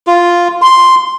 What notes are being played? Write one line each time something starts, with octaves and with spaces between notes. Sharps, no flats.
F4
C6